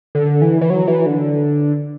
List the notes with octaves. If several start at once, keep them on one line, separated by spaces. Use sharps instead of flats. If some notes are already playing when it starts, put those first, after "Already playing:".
D3
E3
E3
F#3
E3
D3